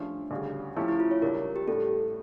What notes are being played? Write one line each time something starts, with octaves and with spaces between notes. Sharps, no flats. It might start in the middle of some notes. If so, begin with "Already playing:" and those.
Already playing: G2 F3 A3 C#4 D4
D2 C#3 G3
F3 A3 C#4 E4 G4
E4
F4
C#5
C#2 C#3 G3 D4 A#4
G4
A2 G3 D4 A4